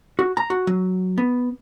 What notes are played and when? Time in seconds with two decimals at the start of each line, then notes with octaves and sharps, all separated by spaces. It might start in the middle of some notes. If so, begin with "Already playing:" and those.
0.19 F#4
0.37 A#5
0.50 F#4
0.67 F#3
1.18 B3